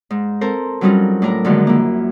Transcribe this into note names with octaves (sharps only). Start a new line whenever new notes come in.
G#2
C4 A4 A#4 C5
F#3 G3 C4 C#4 D#4 F4
A2 D4 A#4 A#5
F#2 D3 D#3 F3 G#3 A#3
A#3 E4